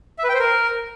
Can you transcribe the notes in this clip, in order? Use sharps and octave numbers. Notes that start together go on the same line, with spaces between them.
E5
B4
G5
C5
A#4